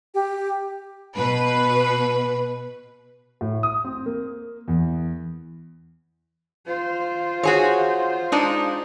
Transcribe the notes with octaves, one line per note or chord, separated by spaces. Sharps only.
G4
B2 B4
A2
D#6
C4
A#3
E2
F4 C5
F#4 G#4 C#5
G#3 D4 D#4